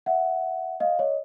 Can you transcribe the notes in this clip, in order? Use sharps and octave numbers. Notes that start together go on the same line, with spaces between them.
E5 F#5
D#5 F5
C#5 D#5